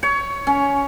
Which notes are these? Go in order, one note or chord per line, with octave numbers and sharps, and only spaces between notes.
C#5
C#4